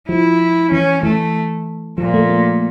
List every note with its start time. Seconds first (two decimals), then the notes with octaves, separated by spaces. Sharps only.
0.09 F3 E4
0.72 E3 C#4
1.03 E3 A3
1.98 A#2 F3
2.14 A3
2.30 A#3